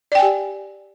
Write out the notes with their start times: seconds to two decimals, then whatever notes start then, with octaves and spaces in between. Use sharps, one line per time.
0.12 D5
0.15 G5
0.19 G#5
0.22 G4